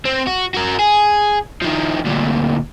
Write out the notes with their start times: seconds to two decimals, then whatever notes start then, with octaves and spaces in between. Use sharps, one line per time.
0.05 C4
0.27 F#4
0.54 F#4 A#4
0.79 G#4
1.62 D#3 F3
2.05 D2 A#2